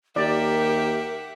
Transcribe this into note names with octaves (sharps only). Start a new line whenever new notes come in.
D#2 G4 A#4 D5 E5 F#5